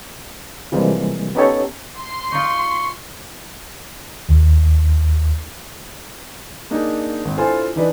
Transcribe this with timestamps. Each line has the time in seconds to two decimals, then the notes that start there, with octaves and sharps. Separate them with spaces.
0.72 C3 E3 F3 G3 G#3 A#3
1.35 B3 C#4 D#4 G4 A4 C#5
1.98 C6
2.32 D#4 F4 C#6
4.29 D#2
6.71 A#3 D4 D#4 G#4
7.25 G#1
7.37 D4 E4 F4 A4 C5 G#5
7.76 E3 D4 D#4 B4 D5